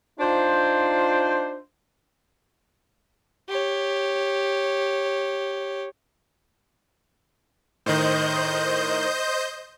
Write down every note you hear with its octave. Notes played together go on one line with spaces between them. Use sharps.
D4 D#4 F4 C5
G4 C#5
A2 D#3 C5 D#5 G6